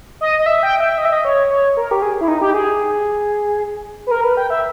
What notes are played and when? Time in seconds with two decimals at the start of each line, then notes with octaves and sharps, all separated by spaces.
0.21 D#5
0.39 D#5
0.46 E5
0.63 G5
0.80 E5
0.98 D#5
1.05 E5
1.13 D#5
1.25 C#5
1.50 C#5
1.77 A#4
1.91 G4
2.02 G#4
2.21 E4
2.28 D#4
2.41 G4
2.54 G#4
4.07 B4
4.11 A#4
4.24 B4
4.37 G5
4.50 E5